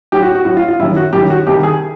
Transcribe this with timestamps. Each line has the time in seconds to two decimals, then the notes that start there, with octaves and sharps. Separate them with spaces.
0.12 A2 F#3 G4
0.23 F#4
0.35 F#4
0.45 A2 F#3 F#4
0.57 F4
0.68 F4
0.80 F#2 D#3 G3 E4
0.96 F#4
1.13 F#2 D#3 G3 G4
1.30 F#4
1.47 C2 C3 D#3 G3 G4
1.63 G#4